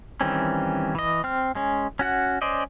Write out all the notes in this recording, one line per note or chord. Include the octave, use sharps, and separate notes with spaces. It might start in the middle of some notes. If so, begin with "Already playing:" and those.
D#3 E3 G3 C4 C#4
E3 D#5
C4 F6
G#3 C#4
C#4 F#4 F#5
C#4 C5 D5 D#5